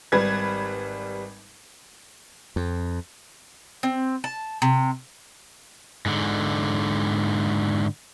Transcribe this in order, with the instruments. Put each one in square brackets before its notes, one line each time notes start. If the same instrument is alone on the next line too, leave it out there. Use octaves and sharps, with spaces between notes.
[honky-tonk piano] G#1 G3 B4 G#6
[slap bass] F2
[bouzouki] C4
A5
C3
[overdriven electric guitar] G#2 D3